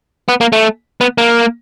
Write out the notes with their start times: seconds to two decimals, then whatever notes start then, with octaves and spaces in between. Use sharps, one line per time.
0.29 B3
0.41 A#3
0.53 A3
1.01 B3
1.18 A#3